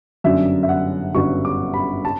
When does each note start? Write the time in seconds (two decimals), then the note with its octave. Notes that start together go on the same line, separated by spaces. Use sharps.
0.24 G1 F#2 D3 F#3 E5
0.63 E5
0.69 F#5
1.15 G1 F#2 D3 F#3 C#6
1.45 D6
1.74 B5
2.05 A5